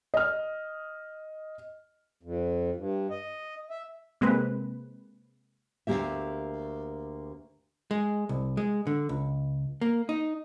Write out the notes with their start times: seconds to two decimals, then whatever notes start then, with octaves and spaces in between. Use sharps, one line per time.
0.14 D#5 F6
2.23 F2
2.76 G2
3.10 D#5
3.70 E5
4.21 C3 G#3 A#3 C4 B4
5.87 D2 B2 A#3 G4 E5
7.91 G#3
8.29 C2
8.57 G#3
8.87 D3
9.09 C#2
9.81 A#3
10.09 D#4